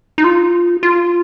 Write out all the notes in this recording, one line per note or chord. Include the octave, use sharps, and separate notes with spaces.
D#4
F4
F4